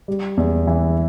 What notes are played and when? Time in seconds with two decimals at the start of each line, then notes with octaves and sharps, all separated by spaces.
0.08 G3
0.37 E2
0.67 E3